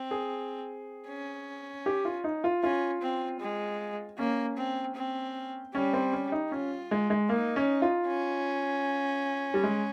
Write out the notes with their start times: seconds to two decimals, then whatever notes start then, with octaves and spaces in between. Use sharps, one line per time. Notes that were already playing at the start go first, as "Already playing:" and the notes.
Already playing: C4
0.11 G#4
1.08 C#4
1.86 G4
2.05 F4
2.24 D#4
2.44 F4
2.63 C#4 F4
3.02 C4
3.40 G#3
4.19 A#3 C#4
4.58 C4
4.96 C4
5.74 G3 C#4
5.93 C4
6.13 C#4
6.32 D#4
6.52 C#4 F4
6.91 G#3
7.10 G#3
7.29 A#3 D#4
7.56 C#4
7.82 F4
8.08 C#4
9.54 G3
9.64 G#3